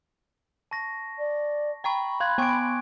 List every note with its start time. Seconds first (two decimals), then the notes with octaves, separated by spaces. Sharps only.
0.71 A5 C#6 A#6
1.18 D5
1.84 G5 A#5 B5 C#6
2.20 F5 C6 F#6 G#6
2.38 B3 G5 G#5 C#6 D6 D7